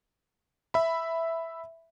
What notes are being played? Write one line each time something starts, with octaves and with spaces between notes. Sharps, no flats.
E5 B5